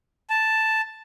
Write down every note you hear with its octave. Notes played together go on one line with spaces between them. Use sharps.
A5